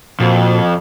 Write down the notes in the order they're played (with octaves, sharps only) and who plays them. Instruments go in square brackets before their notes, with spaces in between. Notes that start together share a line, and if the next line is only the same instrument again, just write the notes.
[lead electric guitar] F2 [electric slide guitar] A#2 F#4 C5